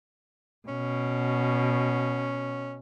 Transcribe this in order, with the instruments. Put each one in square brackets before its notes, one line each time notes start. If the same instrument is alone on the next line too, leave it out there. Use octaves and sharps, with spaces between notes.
[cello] B2 [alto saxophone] C#4